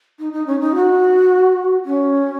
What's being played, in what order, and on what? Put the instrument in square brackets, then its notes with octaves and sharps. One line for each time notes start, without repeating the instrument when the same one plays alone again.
[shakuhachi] D#4
D#4
C#4
D#4
F#4
C#4